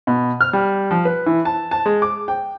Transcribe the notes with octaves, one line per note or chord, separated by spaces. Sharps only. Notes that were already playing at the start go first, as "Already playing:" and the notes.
B2
F6
G3
F3
B4
E3
A5
A5
G#3
D6
G5